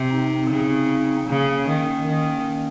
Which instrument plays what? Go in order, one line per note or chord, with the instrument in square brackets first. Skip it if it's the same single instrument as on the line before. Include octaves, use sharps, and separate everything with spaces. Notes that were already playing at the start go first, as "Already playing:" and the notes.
Already playing: [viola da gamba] C3
[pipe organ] C4 D#4
[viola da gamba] C#3
[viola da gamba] C#3 [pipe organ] A#3 C#4
[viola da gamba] D#3
D#3